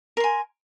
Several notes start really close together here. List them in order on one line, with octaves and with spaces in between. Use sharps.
A#4 C6 G#5